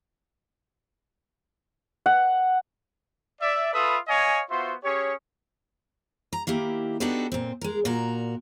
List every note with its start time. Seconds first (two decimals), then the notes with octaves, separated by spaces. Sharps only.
2.06 F#5
3.41 D5 E5
3.73 F4 A4 B4 E5 B5 D#6
4.08 C#5 D#5 F5 G#5
4.50 B3 F4 F#4 C5 E5 C6
4.84 C#4 G4 G#4 C#5
6.33 A#5
6.47 D#3 A#3 E4 G4
7.00 B3 D4 D#4 F#4 G4 A4
7.32 A#2 C4
7.61 G#3 A#4
7.85 A#2 F#4 A#4